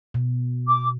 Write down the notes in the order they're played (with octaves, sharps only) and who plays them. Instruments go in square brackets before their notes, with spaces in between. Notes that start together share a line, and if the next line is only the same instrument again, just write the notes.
[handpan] B2
[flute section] D6